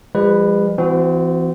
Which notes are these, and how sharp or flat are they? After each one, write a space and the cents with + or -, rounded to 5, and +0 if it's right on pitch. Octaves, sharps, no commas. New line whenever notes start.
F3 +0 G#3 -45 B4 +0
E3 +25 C4 -25 F#4 +0